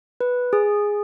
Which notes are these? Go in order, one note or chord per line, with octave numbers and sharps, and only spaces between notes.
B4
G#4